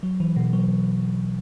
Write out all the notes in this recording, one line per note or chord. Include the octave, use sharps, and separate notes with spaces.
F#3
E3
B2
F#3